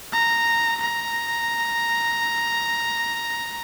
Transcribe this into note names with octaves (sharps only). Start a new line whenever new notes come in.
A#5
A#5